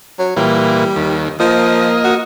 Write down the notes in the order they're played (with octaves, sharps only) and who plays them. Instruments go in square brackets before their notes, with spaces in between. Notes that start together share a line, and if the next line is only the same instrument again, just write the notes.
[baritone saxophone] F#3
[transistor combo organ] A#2 E3 [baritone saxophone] G3
[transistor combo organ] D#2
[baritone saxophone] F3 [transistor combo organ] A#3 D#5
[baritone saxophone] F#4